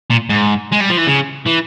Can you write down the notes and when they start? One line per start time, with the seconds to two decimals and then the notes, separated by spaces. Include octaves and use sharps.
0.10 A#2
0.30 G#2
0.72 G#3
0.81 G3
0.90 F3
0.98 E3
1.08 C#3
1.47 E3